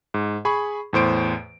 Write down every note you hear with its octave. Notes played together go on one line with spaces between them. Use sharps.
G#2
G#4 B5 C#6
E2 A2 C5 D7